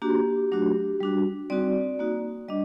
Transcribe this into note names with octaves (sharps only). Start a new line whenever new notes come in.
A#3 D4 F#4 G4
F#3 A3 D4 F#4
G3 D4 F#4
G3 C4 D#4 F#4 D5
A#3 D#4 F#4
G3 D4 D#5